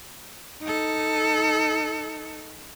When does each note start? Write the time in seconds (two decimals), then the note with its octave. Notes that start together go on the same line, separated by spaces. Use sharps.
0.62 D#4 A4